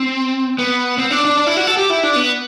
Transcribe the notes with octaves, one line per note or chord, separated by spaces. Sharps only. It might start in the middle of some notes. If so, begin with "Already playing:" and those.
Already playing: C4
B3
C4
D4
D4
D4
E4
F#4
A4
G4
E4
D4
B3